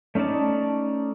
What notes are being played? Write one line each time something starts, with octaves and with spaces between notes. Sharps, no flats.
A3 C#4 D#4 D5 A5